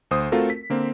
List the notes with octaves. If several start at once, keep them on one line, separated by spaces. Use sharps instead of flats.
D2 C5 D#6
A3 C4 F4 F#4 A4 A#4
B6
D3 A#3 C4